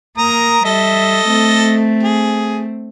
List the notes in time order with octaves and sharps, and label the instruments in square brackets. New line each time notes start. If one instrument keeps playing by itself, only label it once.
[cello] A#3 A#4 [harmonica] A#5 D#6
[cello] G3 E5 [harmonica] A4 D#5
[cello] A3 C4
[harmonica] G#4